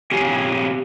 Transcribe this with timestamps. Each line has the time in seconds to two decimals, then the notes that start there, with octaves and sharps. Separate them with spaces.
0.11 C4 G4 C#5 F5 G#5